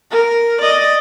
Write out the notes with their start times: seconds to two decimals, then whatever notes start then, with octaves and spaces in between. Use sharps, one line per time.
0.11 A#4
0.62 D5 D#5